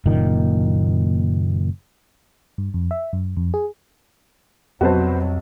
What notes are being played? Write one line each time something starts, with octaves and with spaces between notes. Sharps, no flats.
F#1 A#2 D#3
G2
F2
E5
F#2
F2
G#4
B1 F2 C3 F#3 F#4 B4 C5 A5